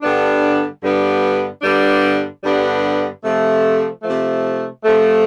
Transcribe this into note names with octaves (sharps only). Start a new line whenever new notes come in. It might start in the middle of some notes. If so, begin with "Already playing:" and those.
G2 D3 G3 B3 D4
G2 D3 G3 B3 D4
G2 D3 G3 B3 D4
G2 D3 G3 B3 D4
C3 F3 A3
C3 F3 A3
C3 F3 A3